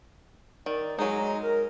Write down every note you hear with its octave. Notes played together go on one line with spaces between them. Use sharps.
D#3 D5
F#3 G#3 D#4 A#5
A#4